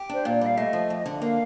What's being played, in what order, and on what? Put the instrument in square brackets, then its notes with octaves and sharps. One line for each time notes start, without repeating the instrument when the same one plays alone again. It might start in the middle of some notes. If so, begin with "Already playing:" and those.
Already playing: [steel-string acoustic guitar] G4
[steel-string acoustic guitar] D4 [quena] C5
[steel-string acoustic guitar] A#2 [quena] D5
[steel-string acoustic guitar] G3 [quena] F5
[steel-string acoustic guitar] A3 [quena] D#5
[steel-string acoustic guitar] F3
F2
D3
[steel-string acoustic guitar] A#3 [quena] F5